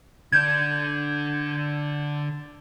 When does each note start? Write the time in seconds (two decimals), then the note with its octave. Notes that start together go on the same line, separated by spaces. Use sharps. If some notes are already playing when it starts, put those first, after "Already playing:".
0.32 D3 D4 G6 G#6